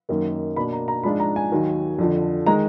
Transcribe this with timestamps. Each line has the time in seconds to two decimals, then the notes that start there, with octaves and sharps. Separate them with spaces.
0.09 F#2 D#3 A#3 D#4
0.56 B2 A#3 D4 B5
0.73 A#5
0.88 A#5
1.03 G#2 F3 G#3 D4 F4 B5
1.20 A#5
1.36 G#5
1.52 D#2 D#3 F#3
1.99 F2 D3 F3
2.46 D#3 G#3 A#5